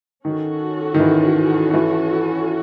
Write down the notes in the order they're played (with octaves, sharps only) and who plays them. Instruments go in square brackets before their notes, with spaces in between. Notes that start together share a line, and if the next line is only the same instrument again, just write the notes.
[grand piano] D#3 [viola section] C#4 F#4 A4
[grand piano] D#3
E3
E3